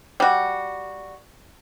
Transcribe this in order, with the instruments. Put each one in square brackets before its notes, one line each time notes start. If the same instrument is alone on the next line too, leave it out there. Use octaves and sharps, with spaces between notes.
[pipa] G3 F#4